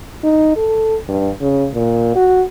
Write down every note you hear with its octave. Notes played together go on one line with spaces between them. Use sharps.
D#4
A4
G2
C#3
A#2
F#4